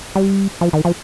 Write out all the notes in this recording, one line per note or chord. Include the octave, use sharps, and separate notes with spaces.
G3
F3
D#3
F3